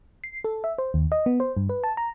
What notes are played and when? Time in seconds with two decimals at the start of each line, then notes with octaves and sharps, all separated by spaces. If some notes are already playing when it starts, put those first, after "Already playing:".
0.24 C7
0.44 A4
0.64 E5
0.78 C5
0.94 D#2
1.12 D#5
1.26 B3
1.40 C5
1.57 G2
1.69 B4
1.84 A5
1.97 A#5